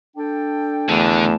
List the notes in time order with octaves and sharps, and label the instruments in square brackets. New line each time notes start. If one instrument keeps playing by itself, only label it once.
[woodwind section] D4 A4 G5
[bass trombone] E2 [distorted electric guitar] D3 [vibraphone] A3